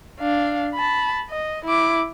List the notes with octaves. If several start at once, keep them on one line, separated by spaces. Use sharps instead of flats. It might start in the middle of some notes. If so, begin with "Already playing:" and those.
D4 F5
A5 B5
D#5
E4 D6